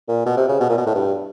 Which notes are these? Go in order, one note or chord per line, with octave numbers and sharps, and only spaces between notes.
A#2
B2
C3
C#3
B2
A#2
B2
A2
G2